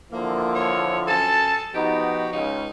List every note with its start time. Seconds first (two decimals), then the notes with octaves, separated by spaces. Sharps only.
0.13 D3 E3 F3 A#3
0.55 C#5
1.08 F#2 A4 G#5 A5
1.74 F3 B3 D#4 F#4 G4
2.33 C#2 C#3 G#3 D#4